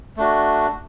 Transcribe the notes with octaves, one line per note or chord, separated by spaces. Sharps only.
A3 D4 F#4